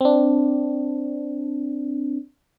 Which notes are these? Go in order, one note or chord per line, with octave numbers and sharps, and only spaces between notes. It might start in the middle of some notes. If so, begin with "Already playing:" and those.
C4 D4